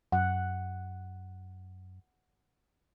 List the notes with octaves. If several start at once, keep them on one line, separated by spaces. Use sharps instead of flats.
F#2 F#5